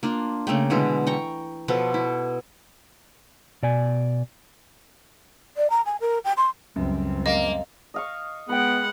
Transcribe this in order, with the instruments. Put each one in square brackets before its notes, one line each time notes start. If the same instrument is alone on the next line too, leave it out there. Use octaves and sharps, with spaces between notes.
[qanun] A#3 D4 F4
C#3 A3 A#3 G5
B2 D3 E3 G#3
G5 A#5 C#6
B2 F3 B3 A4
E4
[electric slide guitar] B2 D5 G#5
[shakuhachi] D5
A#5
G#5
A#4
G5
C6
[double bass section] C#2 G3 C4 [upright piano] F#2
[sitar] A#3 [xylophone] D#5
[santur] D#5 F5 C#6
[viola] G#3 F#5 [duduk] B3 [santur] B4 G5